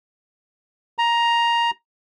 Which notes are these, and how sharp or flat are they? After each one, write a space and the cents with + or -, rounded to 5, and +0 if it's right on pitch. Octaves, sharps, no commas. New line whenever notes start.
A#5 +10